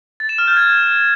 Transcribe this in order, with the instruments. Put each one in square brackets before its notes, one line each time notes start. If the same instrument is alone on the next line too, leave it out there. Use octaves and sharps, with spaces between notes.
[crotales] A6
E7
F6
G6
G#6